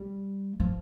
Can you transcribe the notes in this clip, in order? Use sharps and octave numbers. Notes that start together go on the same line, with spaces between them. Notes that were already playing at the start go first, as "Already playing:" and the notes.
Already playing: G3
F3